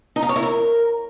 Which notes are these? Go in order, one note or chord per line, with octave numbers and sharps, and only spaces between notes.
D#4
F5
C#5
E4
A#4